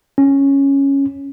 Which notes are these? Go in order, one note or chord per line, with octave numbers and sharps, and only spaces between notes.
C#4